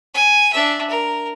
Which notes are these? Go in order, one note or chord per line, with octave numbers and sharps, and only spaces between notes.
G#5
D4 E5
A#4